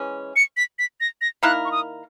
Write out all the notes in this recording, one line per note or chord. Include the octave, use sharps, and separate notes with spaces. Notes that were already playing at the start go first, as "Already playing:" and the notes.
Already playing: E3 G#3 C#4
C#7
B6
B6
A#6
A#6
D#3 A#3 E4 A#4 F#6
C#6
D#6